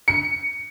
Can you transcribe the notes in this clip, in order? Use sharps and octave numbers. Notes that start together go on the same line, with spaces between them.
C#7